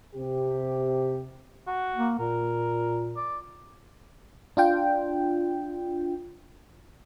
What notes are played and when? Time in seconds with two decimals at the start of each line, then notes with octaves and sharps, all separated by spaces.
0.16 C3 G4
1.67 F#4
1.96 A#3
2.19 A#2 A#4
3.16 D5
4.57 D4 F4 G5